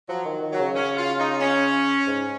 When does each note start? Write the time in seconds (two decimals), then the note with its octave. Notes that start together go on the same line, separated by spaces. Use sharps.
0.08 F3 F#3
0.25 D#3
0.42 D#3
0.52 F#3
0.59 C#3
0.76 C#4
0.97 F4
1.19 D#4
1.41 C#4
2.07 G#2